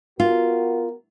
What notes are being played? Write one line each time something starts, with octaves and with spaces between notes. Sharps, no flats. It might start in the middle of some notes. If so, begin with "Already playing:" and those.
B3 F4 F#4 A#4